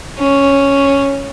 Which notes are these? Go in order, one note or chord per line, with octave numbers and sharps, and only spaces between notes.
C#4